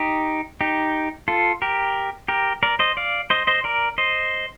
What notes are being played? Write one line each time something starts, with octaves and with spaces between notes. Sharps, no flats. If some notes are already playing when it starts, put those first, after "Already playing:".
Already playing: D#4 G4
D#4 G4
F4 A4
G4 A#4
G4 A#4
A#4 D5
C5 D#5
D5 F5
C5 D#5
C5 D#5
A#4 D5
C5 D#5